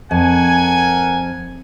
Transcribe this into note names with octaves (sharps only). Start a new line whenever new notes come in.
F2 A#4 F#5 G#5